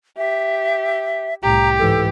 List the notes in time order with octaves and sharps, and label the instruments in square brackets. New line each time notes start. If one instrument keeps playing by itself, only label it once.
[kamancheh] G4 [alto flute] E5
[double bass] C2 A2 [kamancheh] G4 [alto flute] A#5
[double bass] G#2 E3 [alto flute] A4